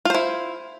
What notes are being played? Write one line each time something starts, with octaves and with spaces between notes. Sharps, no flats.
E4 F4 C5